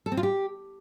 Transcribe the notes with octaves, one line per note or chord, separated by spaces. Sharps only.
A4
C4
F4
G4